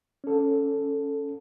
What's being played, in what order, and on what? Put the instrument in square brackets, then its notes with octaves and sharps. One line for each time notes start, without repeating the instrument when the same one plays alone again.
[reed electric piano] C#4 A4